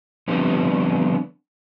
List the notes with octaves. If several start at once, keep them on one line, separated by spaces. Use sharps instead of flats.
D3 F3 G3 B3 C4 D4